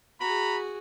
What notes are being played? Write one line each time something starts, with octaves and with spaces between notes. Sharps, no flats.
F#4 G#4 A#5 B5